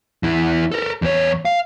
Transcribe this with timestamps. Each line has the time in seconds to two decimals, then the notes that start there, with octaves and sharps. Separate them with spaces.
0.23 E2 E4
0.72 A4 A#4
1.02 E2 C#5
1.45 F5